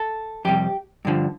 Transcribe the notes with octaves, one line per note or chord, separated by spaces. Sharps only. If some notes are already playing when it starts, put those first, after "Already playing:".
Already playing: A4
F2 C3 G3 G4
G2 D3 F3